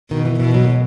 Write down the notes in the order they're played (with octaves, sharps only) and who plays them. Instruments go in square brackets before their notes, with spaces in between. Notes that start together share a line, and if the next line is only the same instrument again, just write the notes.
[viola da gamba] B2 [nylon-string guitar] D#3
[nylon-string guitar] E3
[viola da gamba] B2 [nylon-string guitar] E3
[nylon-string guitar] F#3
A#3
G#3